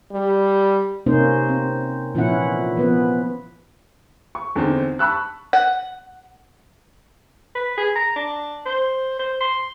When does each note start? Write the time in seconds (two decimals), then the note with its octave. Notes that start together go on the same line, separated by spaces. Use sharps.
0.12 G3
1.06 C3 A#3 C#4 D#4 C5
1.49 C4
2.15 A#2 E3 F3 C#4 E4 F#5
2.77 F3 B3 B4
4.35 C#6
4.56 E2 D3 C4 D#4
4.99 A5 B5 C#6 E6 F#6
5.53 F#5
7.55 B4
7.77 G#4
7.96 A#5
8.16 D4
8.66 C5
9.19 C5
9.40 C6